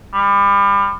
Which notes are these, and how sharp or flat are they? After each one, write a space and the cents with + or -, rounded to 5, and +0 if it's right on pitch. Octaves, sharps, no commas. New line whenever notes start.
G3 +35